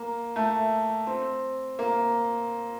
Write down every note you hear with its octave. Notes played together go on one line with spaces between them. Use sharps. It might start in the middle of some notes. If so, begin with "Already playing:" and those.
Already playing: A#3
A3
C4
A#3